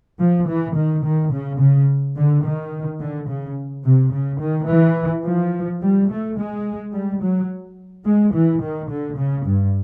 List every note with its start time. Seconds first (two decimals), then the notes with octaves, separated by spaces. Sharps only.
0.20 F3
0.48 E3
0.76 D#3
1.05 D#3
1.33 C#3
1.60 C#3
2.17 D3
2.45 D#3
3.01 D3
3.29 C#3
3.85 C3
4.13 C#3
4.41 D#3
4.69 E3
5.26 F3
5.82 G3
6.09 A3
6.38 G#3
6.93 G3
7.22 F#3
8.06 G#3
8.34 E3
8.62 D#3
8.90 D3
9.18 C#3
9.46 G2